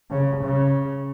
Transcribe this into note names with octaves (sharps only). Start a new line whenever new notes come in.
C#3
C#3